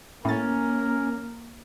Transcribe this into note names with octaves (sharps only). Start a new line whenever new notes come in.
A2 A#3 C#4 A#4 A6